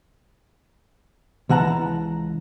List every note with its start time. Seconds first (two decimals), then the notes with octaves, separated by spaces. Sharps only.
1.49 C#2 E3 F#5 A5 A#5